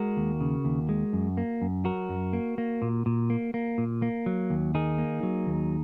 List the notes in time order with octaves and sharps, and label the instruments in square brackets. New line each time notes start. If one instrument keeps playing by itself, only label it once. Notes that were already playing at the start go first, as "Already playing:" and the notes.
Already playing: [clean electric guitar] G#3 F#4 A#4
D#2
C#3
D#2
G#3
F#2
A#3
F#2
F#3 F#4 A#4
F#2
A#3
A#3
A#2
A#2
A#3
A#3
A#2
A#3
F#3
D#2
D#3 D#4 G#4
A#3
F#3
D#2